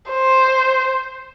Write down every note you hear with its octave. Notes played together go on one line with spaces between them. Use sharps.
C5